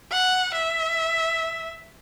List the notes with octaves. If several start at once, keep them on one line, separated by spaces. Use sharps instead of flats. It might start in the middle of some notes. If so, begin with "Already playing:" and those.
F#5
E5